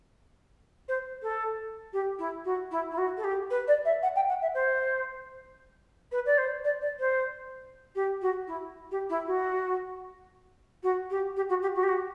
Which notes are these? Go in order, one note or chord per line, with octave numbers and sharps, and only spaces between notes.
C5
A4
G4
E4
F#4
E4
E4
F#4
A4
G4
B4
D5
E5
F#5
G5
F#5
E5
C5
B4
D5
C5
D5
D5
C5
G4
F#4
E4
G4
E4
F#4
F#4
G4
G4
F#4
G4
F#4
G4
F#4